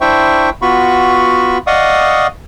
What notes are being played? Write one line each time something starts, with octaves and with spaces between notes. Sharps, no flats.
D4 E4 C5 E5 G5 C#6
B3 F4 F#4 B5 C#6
D5 D#5 F5 F#5 C#6 D#6